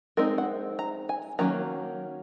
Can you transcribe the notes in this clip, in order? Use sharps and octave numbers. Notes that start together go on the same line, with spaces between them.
G#3 C4 D#4 A#4
F#5
A#5
G#5
D#3 F#3 A#3 C#4 A#5